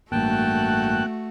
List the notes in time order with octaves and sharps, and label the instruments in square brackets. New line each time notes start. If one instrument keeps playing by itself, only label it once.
[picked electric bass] A1 G2 [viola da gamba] A3 F#4 [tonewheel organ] A#3 F#6 [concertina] G5 A5